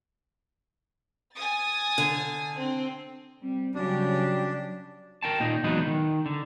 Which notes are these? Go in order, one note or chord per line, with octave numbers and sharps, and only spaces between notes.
G#5 D#6 A6
D3
C4
G3 C4
C#3 F#3 G3 D4 G4
A#4 G5 A5
A#2 D#4
E2 F#3 G#3 D#4 B4
D#3
D3